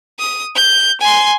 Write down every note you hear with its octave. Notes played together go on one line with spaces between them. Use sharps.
D#6
G6
G#5 C6